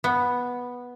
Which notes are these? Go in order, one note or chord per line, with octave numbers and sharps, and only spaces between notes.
B3